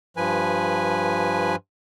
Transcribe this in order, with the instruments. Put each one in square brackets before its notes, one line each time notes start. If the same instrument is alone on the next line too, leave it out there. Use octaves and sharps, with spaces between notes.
[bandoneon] G2 F3 B4 G#5